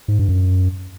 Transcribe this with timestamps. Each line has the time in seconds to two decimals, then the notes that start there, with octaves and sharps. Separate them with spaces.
0.08 G#2
0.19 G2
0.29 F#2